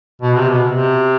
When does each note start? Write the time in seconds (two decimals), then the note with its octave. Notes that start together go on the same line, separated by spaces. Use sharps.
0.22 B2
0.36 C3
0.50 B2
0.67 C3